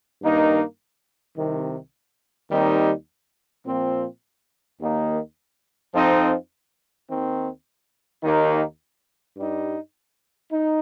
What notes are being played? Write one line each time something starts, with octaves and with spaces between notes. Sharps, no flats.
G2 D#3 A#3 D#4
C2 C3 D#3
D#2 D#3 G3 C4 D#4
A#2 F3 C4
D#2 D#3 A#3 D#4
F2 F3 C4 D#4
D#2 D#3 C4
D#2 D#3 A#3 D#4
G2 G3 D#4
D#4